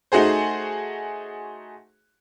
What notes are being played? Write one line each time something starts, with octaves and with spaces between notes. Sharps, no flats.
A3 D#4 F#4 G#4 C5